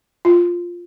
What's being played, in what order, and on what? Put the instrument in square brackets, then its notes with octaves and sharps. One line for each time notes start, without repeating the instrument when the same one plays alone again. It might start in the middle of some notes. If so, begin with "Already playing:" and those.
[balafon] F4